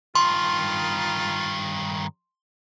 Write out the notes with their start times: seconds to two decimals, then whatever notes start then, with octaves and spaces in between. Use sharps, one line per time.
0.15 G2 D#3 F4 C6